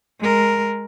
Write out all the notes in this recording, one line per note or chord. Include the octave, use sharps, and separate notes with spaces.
G#3 A#4